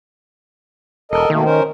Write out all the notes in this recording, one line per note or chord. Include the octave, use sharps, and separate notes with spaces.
E1 A4 A#4 D#5
B2 D#3 A3 A#3
C#4 A#4 C5